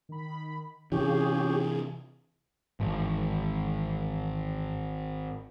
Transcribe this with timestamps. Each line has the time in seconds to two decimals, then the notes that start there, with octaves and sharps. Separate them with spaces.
0.09 D#3 B5
0.92 C3 E3 C#4 F4 G4 G#4
2.80 G#1 G#2 E3